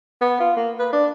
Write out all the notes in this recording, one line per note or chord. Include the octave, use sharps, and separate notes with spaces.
B3
F4
A#3
B4
D4